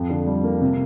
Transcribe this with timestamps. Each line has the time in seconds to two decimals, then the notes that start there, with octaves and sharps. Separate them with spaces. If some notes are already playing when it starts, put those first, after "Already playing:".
Already playing: F2
0.10 D3
0.27 G3
0.44 A#3
0.61 C3